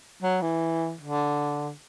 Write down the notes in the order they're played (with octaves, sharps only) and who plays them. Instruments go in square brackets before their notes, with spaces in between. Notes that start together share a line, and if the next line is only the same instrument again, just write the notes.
[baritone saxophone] F#3
E3
D3